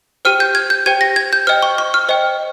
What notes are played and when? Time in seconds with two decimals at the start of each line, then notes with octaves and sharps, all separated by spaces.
0.25 G4 C5 G5 F6
0.40 G6
0.55 G#6
0.70 G6
0.86 G4 C5 G5 G#6
1.01 A#6
1.16 G#6
1.33 G6
1.47 C5 D#5 G5 F6
1.62 C#6
1.78 C#6
1.94 F6
2.09 C5 D#5 G5